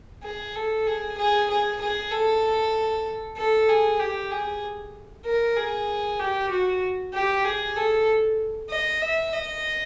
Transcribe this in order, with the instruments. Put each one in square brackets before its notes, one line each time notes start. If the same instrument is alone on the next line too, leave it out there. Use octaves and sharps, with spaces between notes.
[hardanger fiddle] G#4
A4
G#4
G#4
G#4
G#4
A4
A4
G#4
G4
G#4
A#4
G#4
G4
F#4
G4
G#4
A4
D#5
E5
D#5